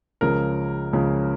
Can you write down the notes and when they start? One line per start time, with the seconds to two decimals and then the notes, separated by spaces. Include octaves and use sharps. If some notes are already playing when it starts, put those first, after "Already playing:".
0.21 C#2 C#3 F3 A#4
0.93 C#2 C#3 F3